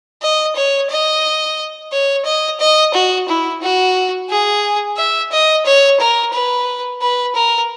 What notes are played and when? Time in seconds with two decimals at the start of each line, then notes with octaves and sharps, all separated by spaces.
0.22 D#5
0.56 C#5
0.90 D#5
1.92 C#5
2.25 D#5
2.60 D#5
2.94 F#4
3.28 E4
3.62 F#4
4.30 G#4
4.97 E5
5.32 D#5
5.65 C#5
6.00 A#4
6.33 B4
7.01 B4
7.35 A#4